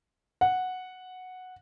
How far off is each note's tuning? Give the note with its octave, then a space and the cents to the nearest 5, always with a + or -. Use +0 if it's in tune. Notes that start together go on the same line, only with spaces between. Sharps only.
F#5 -5